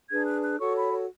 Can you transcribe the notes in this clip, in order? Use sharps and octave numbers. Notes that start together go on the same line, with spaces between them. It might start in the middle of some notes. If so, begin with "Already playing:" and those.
D4 G#4 B4 G#6
F#6
F#6
F#4 A4 C#5 C#6
B5
C#5